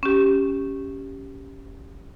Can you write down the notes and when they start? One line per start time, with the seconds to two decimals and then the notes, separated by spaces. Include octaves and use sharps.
0.03 C#4 G4